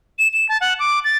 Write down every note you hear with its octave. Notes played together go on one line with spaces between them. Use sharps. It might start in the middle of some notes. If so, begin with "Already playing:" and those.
E7
E7
A5
F#5
D6
A6